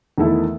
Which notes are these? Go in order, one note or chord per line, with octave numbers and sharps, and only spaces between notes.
E2 D#3 A3 E4 A4